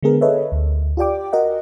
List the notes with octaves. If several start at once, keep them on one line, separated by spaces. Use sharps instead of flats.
D3 G#3 B3 G#4 A#4
G#4 A4 B4 C#5 D#5 E5
D2
F4 G4 D5 G5 D6
F#4 A#4 D#5 F#5